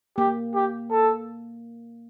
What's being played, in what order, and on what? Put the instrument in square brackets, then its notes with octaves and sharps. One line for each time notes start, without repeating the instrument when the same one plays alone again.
[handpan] A#3 [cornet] G4
[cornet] G4
A4